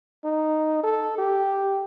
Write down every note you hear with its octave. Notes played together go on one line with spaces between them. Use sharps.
D#4
A4
G4